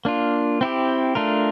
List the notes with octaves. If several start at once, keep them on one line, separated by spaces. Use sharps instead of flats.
A#3 D4 F4
C4 E4 G4
A3 D4 F4 A#4